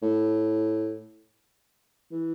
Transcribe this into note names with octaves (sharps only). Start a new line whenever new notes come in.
A2
E3